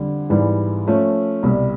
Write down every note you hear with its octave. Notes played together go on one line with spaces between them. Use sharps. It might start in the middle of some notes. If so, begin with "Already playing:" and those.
Already playing: F2 D3 G3
G#2 E3 G3 B3
F3 A3 C#4
C2 B2 G3